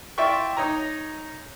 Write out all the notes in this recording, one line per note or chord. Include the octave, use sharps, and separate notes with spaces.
E4 F4 D5 E5 G5 C#6
D#4 C#5 D#5 A#5